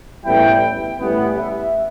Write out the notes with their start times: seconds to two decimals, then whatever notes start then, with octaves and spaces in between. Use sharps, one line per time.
0.25 A1 A2 G3 B3 E4 G5
0.99 A1 A2 E3 G3 B3
1.37 E5